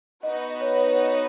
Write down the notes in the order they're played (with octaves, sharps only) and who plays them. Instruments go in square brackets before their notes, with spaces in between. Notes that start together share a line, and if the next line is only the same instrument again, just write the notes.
[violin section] B3 D#4 F#4 B4 [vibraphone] D#5
[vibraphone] C#5